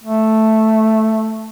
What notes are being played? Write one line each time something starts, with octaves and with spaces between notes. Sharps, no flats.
A3